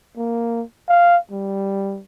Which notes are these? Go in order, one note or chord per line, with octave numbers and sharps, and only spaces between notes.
A#3
F5
G3